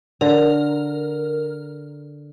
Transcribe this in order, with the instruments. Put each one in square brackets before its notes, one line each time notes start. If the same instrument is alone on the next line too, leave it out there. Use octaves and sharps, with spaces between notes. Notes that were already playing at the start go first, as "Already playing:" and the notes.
[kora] D3 [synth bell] A#4